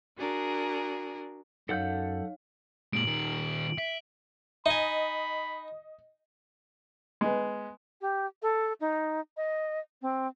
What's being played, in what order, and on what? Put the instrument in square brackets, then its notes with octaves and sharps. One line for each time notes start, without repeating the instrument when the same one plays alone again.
[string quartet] D4 F#4 G#4 A#4
[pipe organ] F#2 [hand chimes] D#4 C#5 F5 [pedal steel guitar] A4 F#5 G6
[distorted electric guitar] A#2 G#3 [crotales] D7 F#7
[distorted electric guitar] A#2 D#3
E5
[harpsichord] D#4 G#5 [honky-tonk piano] D#5 [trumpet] B5
[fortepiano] G#3 B3
[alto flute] G4
A4
D#4
D#5
C4